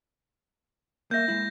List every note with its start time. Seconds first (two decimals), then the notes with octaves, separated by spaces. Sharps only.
1.11 A#3 E5 G6 A#6
1.28 G#3 E4